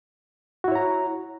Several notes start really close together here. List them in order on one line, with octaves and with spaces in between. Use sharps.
F#4 E4 C#5 A#5